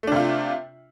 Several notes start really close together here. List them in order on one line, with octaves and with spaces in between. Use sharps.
A3 D4 C3 F4